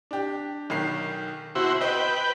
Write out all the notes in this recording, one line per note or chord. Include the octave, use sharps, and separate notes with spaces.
D4 G4
B1 D#3 C7
B2 E4 F#4 C5
B4 C5 D#5 G5